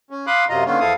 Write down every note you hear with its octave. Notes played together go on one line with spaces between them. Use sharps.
C#4
F5 B5 C6 D6 D#6 F#6
F#2 C3 F#3 F4 D#5 A#5
D3 D#3 A#3 B3 C#4 F4
E2 F3 E4 A4 F5 D#6